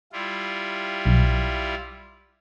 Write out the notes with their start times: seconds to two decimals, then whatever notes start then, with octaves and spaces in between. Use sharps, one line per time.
0.13 G3 E4 F4
1.05 B1